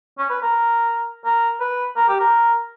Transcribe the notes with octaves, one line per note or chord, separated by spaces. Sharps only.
C#4
B4
A#4
A#4
B4
A#4
G4
A#4